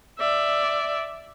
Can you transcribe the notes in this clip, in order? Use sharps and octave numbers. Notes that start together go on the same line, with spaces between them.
D5 E5